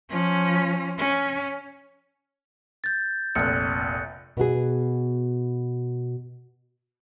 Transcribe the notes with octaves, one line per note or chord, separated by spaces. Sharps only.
F3 C#4
C#4
G6 A6
F1 A#1 F#6 C#7
B2 B3 F#4 G#4